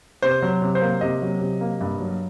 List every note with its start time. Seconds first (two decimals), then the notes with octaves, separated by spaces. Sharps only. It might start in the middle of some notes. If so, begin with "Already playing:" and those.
0.22 C3 C5
0.42 F#3
0.62 C3
0.75 C5
0.82 A#3
1.01 C3 D#5
1.22 F#3
1.41 C3
1.61 A#3
1.81 G2
2.00 F#3